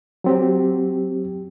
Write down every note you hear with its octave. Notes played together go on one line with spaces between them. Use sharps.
F#3 C4 G4